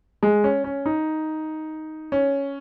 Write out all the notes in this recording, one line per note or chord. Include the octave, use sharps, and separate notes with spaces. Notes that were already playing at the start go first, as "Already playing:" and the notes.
G#3
C#4
C#4
D#4
C#4